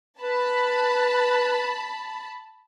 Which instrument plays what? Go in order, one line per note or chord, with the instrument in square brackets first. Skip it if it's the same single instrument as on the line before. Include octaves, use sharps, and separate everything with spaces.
[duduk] B4 [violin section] A5 B5